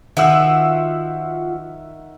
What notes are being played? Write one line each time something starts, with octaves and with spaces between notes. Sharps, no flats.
D#3 F3 F#4 E5 F#5 E6